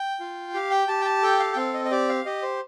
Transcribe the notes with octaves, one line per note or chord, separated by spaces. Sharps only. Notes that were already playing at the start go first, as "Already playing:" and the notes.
Already playing: G5
F4
G4 F5
G5
G4 A5
G5
A5
A4 G5
F5
G5
C4 F5
D#5
D#5
G4 D5
F5
G4 D#5
C5